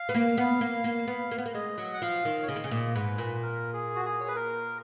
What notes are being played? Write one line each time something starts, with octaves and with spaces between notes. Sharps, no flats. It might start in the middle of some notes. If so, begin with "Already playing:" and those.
Already playing: F5
B3
A#3
B3
A#3
A#3
B3
A#3
B3
A#3
G#3 D#5
F#3
F#5
F3 F5
D#3
C#5
C#3 D#5
D#3
C#3
A#2
G#2 B4
A#2
A#4
G#4
F#4
G#4
C#5
B4
A#4